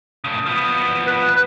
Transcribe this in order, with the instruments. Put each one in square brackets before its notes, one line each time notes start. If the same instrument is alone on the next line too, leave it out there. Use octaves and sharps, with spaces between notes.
[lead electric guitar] A2 C#3
F3 B3
[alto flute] B4